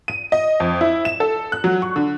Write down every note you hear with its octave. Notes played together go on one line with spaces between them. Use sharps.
D#7
D#5
F2
E4
E7
A4
F#6
F#3
C#6
D3